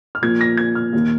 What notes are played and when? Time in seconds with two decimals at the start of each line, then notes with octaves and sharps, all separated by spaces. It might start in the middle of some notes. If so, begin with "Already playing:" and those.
0.15 F6
0.22 A#2 F3 A#3 G#6
0.41 A#6
0.57 G#6
0.75 F6
0.93 D#2 D#3 A#3